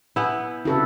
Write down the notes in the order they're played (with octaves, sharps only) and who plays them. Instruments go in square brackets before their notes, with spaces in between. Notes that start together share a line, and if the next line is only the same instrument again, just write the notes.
[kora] B3 E4 [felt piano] G#5 E6 G6
[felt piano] C2 C#3 F#4 [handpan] E4 A4 B4